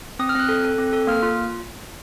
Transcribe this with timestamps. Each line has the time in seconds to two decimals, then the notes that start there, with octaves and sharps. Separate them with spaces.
0.19 C4 D#6
0.29 F6
0.35 C4 F#6
0.49 A4
0.64 A4
0.78 C4
0.93 A4
1.07 A#3 F6
1.23 F4